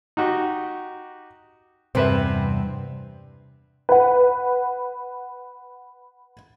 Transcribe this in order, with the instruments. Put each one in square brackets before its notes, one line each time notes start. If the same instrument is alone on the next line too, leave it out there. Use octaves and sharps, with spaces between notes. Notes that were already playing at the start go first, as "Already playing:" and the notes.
[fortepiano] D#4 F#4 G4
[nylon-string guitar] E2 G2 C3 [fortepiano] C4 B4 E5
[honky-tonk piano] B4 F#5